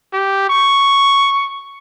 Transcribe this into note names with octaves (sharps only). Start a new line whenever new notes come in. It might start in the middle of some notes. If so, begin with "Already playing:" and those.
G4
C#6